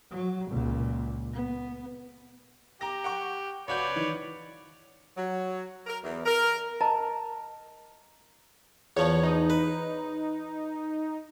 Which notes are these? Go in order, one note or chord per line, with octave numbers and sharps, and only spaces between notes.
F#3
C#2 A#2
B3
G4 A#5 D6 A#6
F#5 G5 C#6
C#2 F#4 B4 C#5 D5 G6
D#3 E3
F#3
A#4
E2
A#4
A#4 D#5 A5 A#5
E2 F3 C#5
D#4
B4